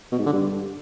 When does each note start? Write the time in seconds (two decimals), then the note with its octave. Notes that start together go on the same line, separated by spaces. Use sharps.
0.12 B2
0.19 G#2
0.26 D3
0.33 G2